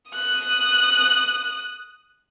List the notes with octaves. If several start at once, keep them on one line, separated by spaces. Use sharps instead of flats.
D#6 F#6